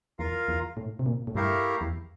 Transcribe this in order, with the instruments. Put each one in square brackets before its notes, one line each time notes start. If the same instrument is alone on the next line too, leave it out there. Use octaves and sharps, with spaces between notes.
[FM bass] E2 [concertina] F4 A#4 F5
[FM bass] E2
A2
C3
A#2
A2
[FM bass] G2 [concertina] A3 E4 G4 A#4 F5
[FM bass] E2